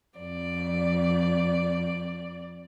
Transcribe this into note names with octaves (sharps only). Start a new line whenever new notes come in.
F2 D5